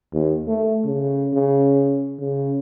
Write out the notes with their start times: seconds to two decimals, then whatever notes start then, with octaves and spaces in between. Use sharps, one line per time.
0.13 D#2
0.48 A3
0.85 C#3
1.33 C#3
2.19 C#3